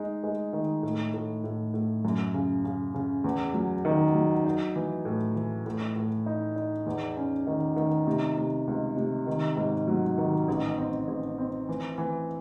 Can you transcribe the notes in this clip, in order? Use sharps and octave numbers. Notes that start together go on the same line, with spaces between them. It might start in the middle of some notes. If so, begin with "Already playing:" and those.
Already playing: G#3 D#4
G#3
D#3
A2
A2
A2
A2
F#2
C#3
C#3
C#3
E2
F#3
D#3
F#3
D#4
E3
A2
E3
A2
A2
D#4
D#4
E2
C#4
D#3
D#3
C3
C3
C#2
C3
D#3
G#2
F#3
D#3
A1
C4
A1
C4
E3
E3